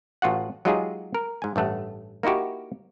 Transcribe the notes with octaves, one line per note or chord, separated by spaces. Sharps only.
A1 F4 F#4 F#5
F#3 G#3 D#4 F4 G4 G#4
A#4
G#2 G#5
A1 G2 A3 F#5
A#3 D#4 E4 F#4 G4